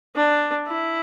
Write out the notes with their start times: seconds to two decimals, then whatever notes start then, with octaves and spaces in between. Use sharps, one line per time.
0.16 D4
0.68 E4